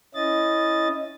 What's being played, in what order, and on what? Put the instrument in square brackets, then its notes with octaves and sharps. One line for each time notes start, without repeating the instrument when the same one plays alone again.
[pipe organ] C#4 E4 D#5 A6